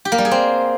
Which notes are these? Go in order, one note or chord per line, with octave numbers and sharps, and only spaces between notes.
G4
A#3
G3
G#4
C4